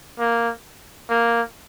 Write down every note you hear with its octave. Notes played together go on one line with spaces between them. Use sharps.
A#3
A#3